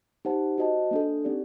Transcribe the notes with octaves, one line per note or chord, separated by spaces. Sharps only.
D#4 G4 C5 F#5 A5
F#4 C5 D#5 A5
A#3 D4 A4
C4 D#4 G4 D5